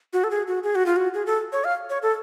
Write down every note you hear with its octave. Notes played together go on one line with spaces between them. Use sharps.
F#4
A4
G#4
F#4
G#4
F#4
F4
F#4
G#4
A4
C#5
F5
C#5
A4